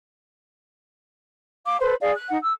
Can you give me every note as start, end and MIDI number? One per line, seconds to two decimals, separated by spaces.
1.65 1.77 77
1.65 1.77 86
1.80 1.94 69
1.80 1.94 71
1.80 1.94 72
2.01 2.12 68
2.01 2.12 74
2.01 2.12 77
2.14 2.28 90
2.30 2.38 63
2.30 2.38 78
2.42 2.52 88